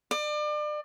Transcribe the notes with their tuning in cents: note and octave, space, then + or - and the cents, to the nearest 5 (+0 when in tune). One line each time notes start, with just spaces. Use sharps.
D5 +35